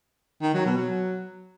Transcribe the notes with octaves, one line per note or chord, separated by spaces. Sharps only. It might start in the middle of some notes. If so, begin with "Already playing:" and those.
D#3
F#3
B2
F#3